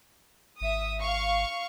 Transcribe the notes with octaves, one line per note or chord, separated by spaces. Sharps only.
G#1 E5 D#6
F5 C#6